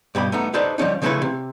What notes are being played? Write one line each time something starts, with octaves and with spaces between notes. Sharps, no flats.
G2 B2 G4 B5
A3 B3 D#4
D#4 G4 A4 B4 C5 D5
F3 G3 C#4 D#4
C#3 F3 A3 C#4 E4 B4
C3